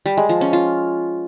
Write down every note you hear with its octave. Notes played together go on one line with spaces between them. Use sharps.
G3
G#3
F3
C#4
F4